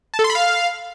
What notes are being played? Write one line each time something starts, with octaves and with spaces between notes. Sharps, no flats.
A5
A4
C6
B5
F5